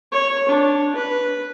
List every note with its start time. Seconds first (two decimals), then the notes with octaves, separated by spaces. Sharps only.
0.12 C#5
0.49 D4
0.96 B4